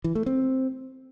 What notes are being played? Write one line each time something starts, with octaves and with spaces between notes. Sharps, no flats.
E3
A3
C4